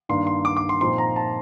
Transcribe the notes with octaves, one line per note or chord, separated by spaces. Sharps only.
G2 D#3 A#3 D4 C6
C6
D6
D6
C6
A#2 F3 C4 D#4 C6
A#5
A5